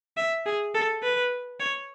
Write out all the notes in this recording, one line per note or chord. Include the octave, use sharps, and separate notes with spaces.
E5
G#4
A4
B4
C#5